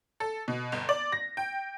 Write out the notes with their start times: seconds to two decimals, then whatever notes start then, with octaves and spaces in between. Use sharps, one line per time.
0.20 A4
0.48 B2
0.72 G1
0.89 D5
1.12 A#6
1.37 G5